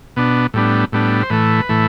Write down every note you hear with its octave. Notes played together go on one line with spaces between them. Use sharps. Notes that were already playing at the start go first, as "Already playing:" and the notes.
B2 B3 D4
A2 G3 B3 D4
A2 G3 B3 D4
C5
A2 E3 A3 B4
A2 E3 A3